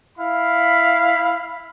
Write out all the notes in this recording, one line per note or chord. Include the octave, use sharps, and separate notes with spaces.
E4 F5 B5